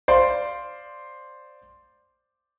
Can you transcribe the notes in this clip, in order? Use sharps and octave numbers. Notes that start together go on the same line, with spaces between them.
C5 D5 F5 C6